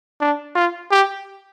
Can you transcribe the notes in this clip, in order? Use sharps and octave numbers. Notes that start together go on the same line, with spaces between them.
D4
F4
G4